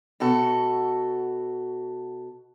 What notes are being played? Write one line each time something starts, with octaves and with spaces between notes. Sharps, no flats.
B2 F#4 A4